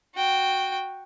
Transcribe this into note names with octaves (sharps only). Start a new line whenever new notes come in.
F#4 G5